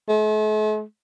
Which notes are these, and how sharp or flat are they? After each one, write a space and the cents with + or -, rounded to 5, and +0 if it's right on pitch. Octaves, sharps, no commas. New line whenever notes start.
A3 -45